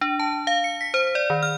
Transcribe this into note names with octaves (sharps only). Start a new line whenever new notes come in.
D4
A5
F5
C#7
B6
C5
D5
D#3
F6